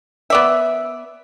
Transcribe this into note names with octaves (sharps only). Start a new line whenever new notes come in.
B3 D5 E5